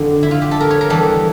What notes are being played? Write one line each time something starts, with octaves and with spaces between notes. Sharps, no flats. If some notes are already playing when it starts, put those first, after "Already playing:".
Already playing: F2 D3 G3
E4
F4
G4
A4
A#4
C#5
A#4
E2 E3 G3 A4